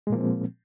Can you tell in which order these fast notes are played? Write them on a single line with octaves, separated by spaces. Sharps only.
G#3 A#2 A#3 F3 C4